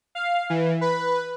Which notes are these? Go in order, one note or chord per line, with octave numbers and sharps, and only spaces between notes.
F5
E3
B4